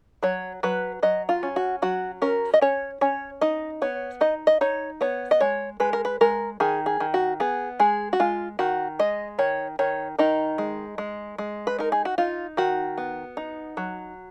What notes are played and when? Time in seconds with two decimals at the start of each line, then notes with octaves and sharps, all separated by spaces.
0.23 F#3 C#5
0.63 F#3 B4
1.03 F#3 D#5
1.29 F4
1.43 C#4
1.56 F#4
1.82 F#3 F#4
2.22 C#4 A#4
2.54 D#5
2.61 C#4 C#5
3.01 C#4 C#5
3.41 D#4 D#5
3.82 B3 C#5
4.21 D#4 D#5
4.47 D#5
4.61 D#4 C#5
5.01 B3 C#5
5.31 D#5
5.41 G#3 C#5
5.80 G#3 B4
5.93 A#4
6.05 B4
6.21 G#3 A#4
6.60 D#3 G#4
6.86 G#4
7.00 D#3
7.14 F#4
7.40 B3 G#4
7.80 G#3 G#4
8.13 F#4
8.20 G#3 F4
8.59 D#3 F#4
8.99 G#3 D#5
9.39 D#3 C#5
9.79 D#3 C#5
10.19 D#3 D#4
10.58 G#3
10.98 G#3
11.38 G#3
11.67 B4
11.79 D#4 A#4
11.92 G#4
12.05 F#4
12.18 D#4 F4
12.57 D#3 F#4
12.98 B3
13.37 D#4
13.77 F#3